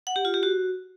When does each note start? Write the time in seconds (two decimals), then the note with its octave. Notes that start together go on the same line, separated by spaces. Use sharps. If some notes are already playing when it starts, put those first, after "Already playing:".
0.07 F#5
0.16 G4
0.25 F4
0.34 G4
0.43 F#4